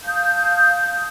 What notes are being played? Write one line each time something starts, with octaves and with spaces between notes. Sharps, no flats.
F5 A5 D#6 G6